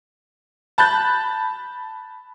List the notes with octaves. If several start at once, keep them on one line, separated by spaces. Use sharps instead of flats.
A5 B5 F#6 G6 A6